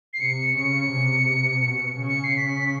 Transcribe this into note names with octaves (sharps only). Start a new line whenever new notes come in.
C7
C3 C#7
C#3 C#7
C3
B2
C#3
C#7
C7
B6
B6